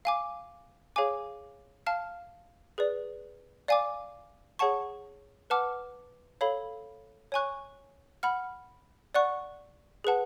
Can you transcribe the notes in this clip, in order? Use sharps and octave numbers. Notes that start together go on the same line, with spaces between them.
F5 G#5 D6
G#4 C#5 F5 G#5 D6
F5 A5 F6
G#4 B4 D5
D5 F5 G#5 D6
G#4 C#5 F#5 A5 C#6
B4 F#5 A5 D6 F6
A4 C#5 F5 B5
C#5 G#5 C#6 F#6
F#5 B5 F6
D5 F#5 C#6 F#6
G#4 B4 F#5 A5